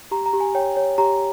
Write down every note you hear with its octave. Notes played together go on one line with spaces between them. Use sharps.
G4 A#5
A#5
G4
G#5
C#5 G5
C#5
G4 A#5